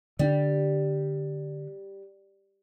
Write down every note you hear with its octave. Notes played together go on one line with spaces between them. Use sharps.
D3 G3 C#4 D4